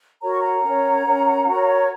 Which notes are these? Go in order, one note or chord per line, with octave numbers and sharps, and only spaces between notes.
F#4 A#4 C#5 A#5
C#6
F#5 A#5
C#4 A#4 C#5
C#4 A#4 C#5
F#4 A#4 C#5